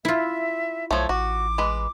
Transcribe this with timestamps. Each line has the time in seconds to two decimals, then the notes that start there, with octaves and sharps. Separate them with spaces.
0.05 E4 F4 E5
0.91 B1 F3 A3 C#5
1.09 A1 F#4 D6
1.58 G#3 B4